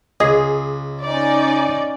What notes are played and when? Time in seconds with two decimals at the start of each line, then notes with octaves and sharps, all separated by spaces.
0.20 C#2 G#4 D#5
1.03 C#4 D#4 D5